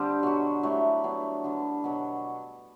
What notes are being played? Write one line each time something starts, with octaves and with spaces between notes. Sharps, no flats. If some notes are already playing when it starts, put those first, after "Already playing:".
Already playing: D3 G3 C4 G4
B2 F#3 B3 F#4
F#3 A3 E4 G4
F#3 B3 D4
D3 G3 B3
B2 F#3